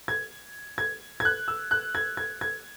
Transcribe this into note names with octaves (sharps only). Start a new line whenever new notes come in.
G#6
G#6
G#6
F#6
E6
F#6
G#6
G#6
G#6